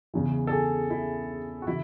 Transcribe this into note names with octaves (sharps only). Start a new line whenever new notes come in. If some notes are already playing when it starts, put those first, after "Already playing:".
E2 C#3 E3
A4
G#4
E4
F#4
C#3 E3 E4